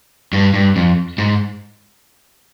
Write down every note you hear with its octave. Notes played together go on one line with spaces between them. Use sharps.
G2
G2
F2
G#2